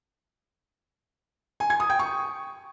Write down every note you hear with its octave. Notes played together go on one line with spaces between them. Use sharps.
G#5
G#6
D#6
G5
C#6